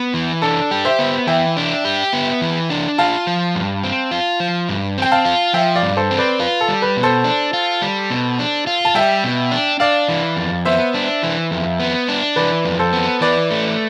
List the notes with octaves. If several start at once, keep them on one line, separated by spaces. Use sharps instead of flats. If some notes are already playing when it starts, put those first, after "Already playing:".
Already playing: B3 B4
E3
D4 A4
G4
C5 E5
B3
E3 E5 G5
D4
G4
B3
E3
D4
F4 F5 A5
F3
G2
C4
F4
F3
G2
C4 G5
F5 A5
F4
F3 E5 G5
D5 F5
G2
A4 C5
C4
B4 D5
F4 B4
A4
G3
B4
B2
A4 C5
D4
F4
G3
B2
D4
F4
A5
G3 E5 G5
B2
D4
D4 D5 F5
E3
F2
B3 C5 E5
D4
E3
F2
B3
D4
E3 B4 D5
F2
A4 C5
B3
E3 B4 D5
A3